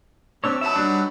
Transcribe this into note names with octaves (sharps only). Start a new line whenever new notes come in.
G3 C4 D4 C#5 E6
F#3 B3 D#4 E5 A5
G3 D4